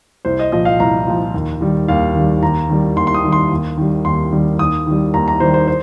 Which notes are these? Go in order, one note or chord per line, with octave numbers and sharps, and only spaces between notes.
C2 C5
D#5
A#2 F3 D#5
F5
C2 A#5
A#2 F3
D#2
D#3 G3
D#2 F5
D#3 G3
D#2 A#5
D#3 G3
D#2 C6
C6
D#6
D#3 G3
C6
D#2
D#3 G3
D#2 C6
D#3 G3
D#2 D#6
D#3 G3
D#2 A#5
A#5
D#3 G3 C5
C5
C5